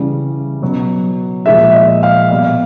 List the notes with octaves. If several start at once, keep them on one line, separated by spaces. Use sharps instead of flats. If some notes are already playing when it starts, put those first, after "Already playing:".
Already playing: C#3 E3 G3
B2 F#3
A#2 F3 G#3 E5
D#5
F5
B2 G3 F5